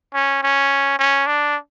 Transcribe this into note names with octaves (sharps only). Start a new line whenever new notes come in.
C#4
C#4
C#4
D4